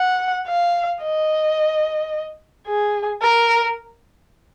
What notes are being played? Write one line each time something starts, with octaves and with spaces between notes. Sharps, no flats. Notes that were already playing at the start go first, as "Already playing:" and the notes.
Already playing: F#5
F5
D#5
G#4
A#4